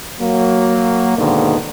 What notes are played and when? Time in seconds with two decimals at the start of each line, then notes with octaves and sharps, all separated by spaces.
0.20 F#3 A#3
1.18 G#2 B2 D3 D#3 A#3